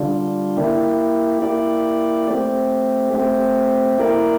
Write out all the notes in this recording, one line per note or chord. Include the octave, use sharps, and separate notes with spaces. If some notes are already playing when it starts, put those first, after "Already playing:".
Already playing: D3 G3 D4 F4
A#3 E4 G4
A#3 E4 G4 D5
A3 C4 G4
A3 C4 G4
A#3 E4 A#4 D5